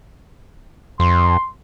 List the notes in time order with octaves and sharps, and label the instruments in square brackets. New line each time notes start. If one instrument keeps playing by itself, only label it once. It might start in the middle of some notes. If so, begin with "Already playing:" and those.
[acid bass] F2 [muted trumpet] C6